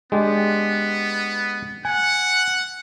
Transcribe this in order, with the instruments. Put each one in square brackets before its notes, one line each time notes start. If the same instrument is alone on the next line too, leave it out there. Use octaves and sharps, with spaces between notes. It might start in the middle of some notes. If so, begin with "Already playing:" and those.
[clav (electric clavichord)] G#3 D4 G4 [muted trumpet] B3
[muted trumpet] F#5 [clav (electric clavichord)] G#5